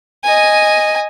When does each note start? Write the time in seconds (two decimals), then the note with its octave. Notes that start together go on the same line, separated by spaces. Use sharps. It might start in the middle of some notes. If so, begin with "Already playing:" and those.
0.24 D#5 G#5